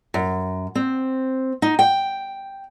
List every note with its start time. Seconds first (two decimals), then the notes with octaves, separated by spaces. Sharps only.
0.14 F#2
0.75 C4
1.62 D#4
1.79 G5